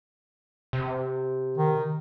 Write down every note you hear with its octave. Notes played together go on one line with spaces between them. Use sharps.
C3
D#3